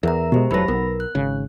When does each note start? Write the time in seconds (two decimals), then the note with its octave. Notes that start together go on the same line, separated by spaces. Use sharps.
0.03 E2 A#4 E5 A#5
0.32 B2 G#3 G4 C5
0.51 F1 F#3 E4 A4 B4 B5 A#6
0.68 B1 B3 A#4
1.00 F#6
1.15 G#1 C#3